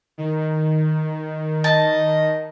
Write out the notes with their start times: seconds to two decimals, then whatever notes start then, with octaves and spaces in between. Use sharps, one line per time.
0.18 D#3
1.64 D#5 A5